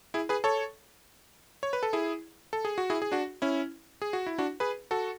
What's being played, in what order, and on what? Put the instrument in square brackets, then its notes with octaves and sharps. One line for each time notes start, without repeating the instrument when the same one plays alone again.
[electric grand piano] E4 G#4
G#4 B4
A4 C#5
C#5
B4
A4
E4 G#4
A4
G#4
F#4
E4 G#4
G#4
D4 F#4
C#4 E4
G#4
F#4
E4
D4 F#4
G#4 B4
F#4 A4